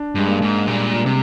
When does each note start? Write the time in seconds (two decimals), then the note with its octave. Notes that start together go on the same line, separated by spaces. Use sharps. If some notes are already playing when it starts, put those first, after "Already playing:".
Already playing: D4
0.15 G2 G#3
0.28 A#3
0.42 G#2
0.67 A#2 G3
1.06 C3